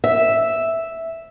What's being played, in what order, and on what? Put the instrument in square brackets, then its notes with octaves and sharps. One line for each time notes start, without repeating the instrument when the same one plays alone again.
[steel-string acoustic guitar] E5